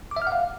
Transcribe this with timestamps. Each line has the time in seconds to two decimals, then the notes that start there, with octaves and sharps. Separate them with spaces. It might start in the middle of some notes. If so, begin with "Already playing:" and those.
0.11 D6
0.16 E5
0.22 F6
0.27 F#5
0.32 F5